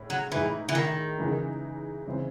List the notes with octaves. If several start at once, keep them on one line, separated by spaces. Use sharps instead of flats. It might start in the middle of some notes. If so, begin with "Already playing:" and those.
Already playing: A2 G#3 C#4
F#3
A2 E3 G#3 D#4
E3
D#3
C#3 E3 G#3 D#4
C#3 E3 C4